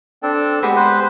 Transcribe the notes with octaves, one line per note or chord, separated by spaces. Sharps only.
C4 D4 A4
G#3 B3 G4
B4 C5